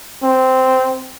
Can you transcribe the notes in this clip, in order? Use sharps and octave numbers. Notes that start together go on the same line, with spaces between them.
C4